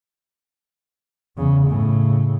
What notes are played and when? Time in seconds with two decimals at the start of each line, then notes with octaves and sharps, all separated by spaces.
1.37 E2 C#3
1.68 A2 C#3